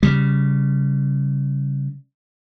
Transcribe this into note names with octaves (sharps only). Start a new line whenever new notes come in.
C#3 G3